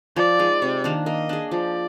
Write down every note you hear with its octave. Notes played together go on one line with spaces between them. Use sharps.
F3 D5
G#3 D#4
C3
D#3 A#3 D4
A#3 D#5
D4 G#4
F3 D5